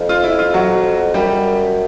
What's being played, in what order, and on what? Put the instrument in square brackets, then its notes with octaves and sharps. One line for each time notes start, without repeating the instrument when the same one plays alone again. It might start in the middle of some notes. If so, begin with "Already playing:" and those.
Already playing: [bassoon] F2
[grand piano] F4
E4
F4
F#3 F#4
[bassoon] F#2 [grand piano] G3 G4